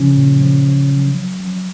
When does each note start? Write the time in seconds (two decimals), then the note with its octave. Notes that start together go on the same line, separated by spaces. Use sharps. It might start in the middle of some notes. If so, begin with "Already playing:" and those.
Already playing: C#3 F3 C#4
0.16 A#2
0.42 F3
0.65 F3
0.91 F#3
1.15 F#3
1.40 F#3